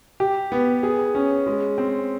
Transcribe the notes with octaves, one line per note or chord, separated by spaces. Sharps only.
G4
B3
G#4
C#4
G#3
C4